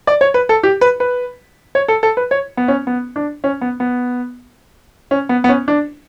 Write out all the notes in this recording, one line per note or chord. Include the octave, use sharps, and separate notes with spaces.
D5
C#5
B4
A4
G4
B4
B4
C#5
A4
A4
B4
C#5
B3
C#4
B3
D4
C#4
B3
B3
C#4
B3
B3
C#4
D4